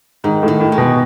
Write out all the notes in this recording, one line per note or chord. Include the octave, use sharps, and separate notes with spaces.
G#2 D#3
A2
D#3
A2
G#3
B2